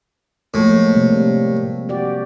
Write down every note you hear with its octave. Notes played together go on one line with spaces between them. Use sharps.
A2 F3 G#3 A#3
C3 G3 A#3
F#4 G4 D5